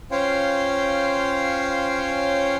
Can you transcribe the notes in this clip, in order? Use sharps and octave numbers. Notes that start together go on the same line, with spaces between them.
C#4 F4 C5 C#5 F5 G5